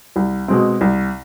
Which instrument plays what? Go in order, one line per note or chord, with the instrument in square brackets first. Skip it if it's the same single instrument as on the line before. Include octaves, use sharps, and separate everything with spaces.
[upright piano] C2
B2 G#3 C4
C2